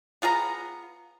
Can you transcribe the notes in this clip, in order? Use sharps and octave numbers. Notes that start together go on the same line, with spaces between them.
B3 F4 G#4 A#5